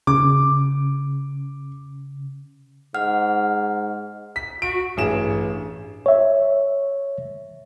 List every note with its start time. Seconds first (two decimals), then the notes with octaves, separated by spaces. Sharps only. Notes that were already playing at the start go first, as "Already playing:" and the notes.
0.07 C#3 D6
2.95 G#2 F#5 F6
4.36 B6
4.62 F#4 D7
4.97 A1 G2 G#4 E7
6.06 C#5 E5